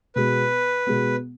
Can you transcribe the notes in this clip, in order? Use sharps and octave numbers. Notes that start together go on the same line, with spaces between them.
B2 G#3 B3 B4
B2 G#3 B3